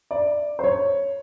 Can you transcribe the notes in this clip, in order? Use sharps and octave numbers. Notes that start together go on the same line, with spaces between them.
D5
C5
C#5